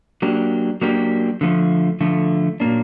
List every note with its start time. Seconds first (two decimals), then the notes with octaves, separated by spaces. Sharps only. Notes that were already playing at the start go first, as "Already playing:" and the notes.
0.22 F#3 A#3 D4 G4
0.82 F#3 A#3 D4 G4
1.41 D3 F3 A3
2.01 D3 F3 A3
2.60 A#2 F#3 A#3 D4